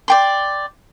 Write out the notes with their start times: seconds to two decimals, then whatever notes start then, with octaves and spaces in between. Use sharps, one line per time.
0.08 D5 G5 C6